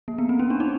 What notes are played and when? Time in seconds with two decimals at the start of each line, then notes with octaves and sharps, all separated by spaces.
0.08 A#3
0.18 B3
0.29 C4
0.39 C#4
0.50 D4
0.60 D#4